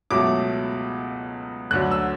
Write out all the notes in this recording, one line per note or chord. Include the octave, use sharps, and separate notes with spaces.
C#2 B2 F#3 A3 D6
D2 D3 F#3 F#6
E6